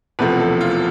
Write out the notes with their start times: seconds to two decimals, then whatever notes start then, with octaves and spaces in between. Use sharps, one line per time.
0.19 E1 E2 C3 F3 A3 B4
0.40 A4
0.61 F4